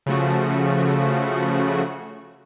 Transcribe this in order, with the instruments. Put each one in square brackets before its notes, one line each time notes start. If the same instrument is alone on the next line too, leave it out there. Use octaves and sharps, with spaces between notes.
[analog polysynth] C#3 F3 A3 F#4